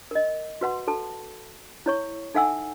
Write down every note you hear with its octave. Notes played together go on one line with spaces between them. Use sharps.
A#4 D#5
F#4 B4 F#5 C6
F#4 A4 A5
E4 C#5 C#6
D#4 A4 E5 F#5 G#5 E6